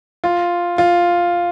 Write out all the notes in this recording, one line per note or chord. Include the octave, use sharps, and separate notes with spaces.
F4
F4